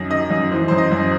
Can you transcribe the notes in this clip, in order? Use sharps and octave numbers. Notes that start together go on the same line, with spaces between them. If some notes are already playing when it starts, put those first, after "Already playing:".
Already playing: F#2 D#3 D#5
D#3 D#5
F#2
E3 C5
F#2 C5
D#5
F#2